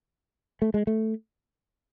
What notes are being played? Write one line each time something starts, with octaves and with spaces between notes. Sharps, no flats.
A3
G#3
A3